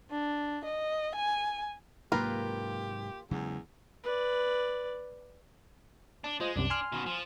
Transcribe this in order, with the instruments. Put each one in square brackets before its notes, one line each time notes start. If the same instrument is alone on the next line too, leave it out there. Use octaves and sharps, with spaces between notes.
[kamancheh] D4
D#5
G#5
[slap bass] G#2 C3 F#3 [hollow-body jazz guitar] A#3 [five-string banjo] F4 A#4 B4 [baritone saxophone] G4
[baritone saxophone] E2 [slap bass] C#3 F#3 G#3
[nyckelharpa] B4 D5
[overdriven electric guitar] D4 [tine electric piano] A5
[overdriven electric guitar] G#3 [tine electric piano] F4 C5 D#5
[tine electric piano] C2 F#2 C3 [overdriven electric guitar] D4
[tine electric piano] G#5 C6 F6
[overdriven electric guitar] B2 D#3
F3